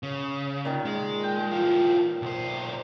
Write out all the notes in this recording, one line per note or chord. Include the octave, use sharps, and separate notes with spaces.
C#3
A#2 D#3
G#3
G5
E3 F4
B1 C5